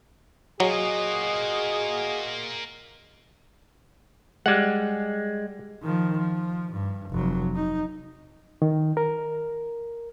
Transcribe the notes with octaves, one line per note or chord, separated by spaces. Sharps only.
F#3 A#3 F4 F#4 G#4 D#5
G3 G#3 F#5
D#3 F3
F3
G2
F1 F#3
D#4
D#3
A#4